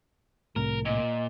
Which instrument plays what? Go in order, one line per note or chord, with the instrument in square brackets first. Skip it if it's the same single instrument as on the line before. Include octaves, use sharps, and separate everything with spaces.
[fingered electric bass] C2 A2 [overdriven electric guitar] A#4
[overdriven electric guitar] A#2 [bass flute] D#5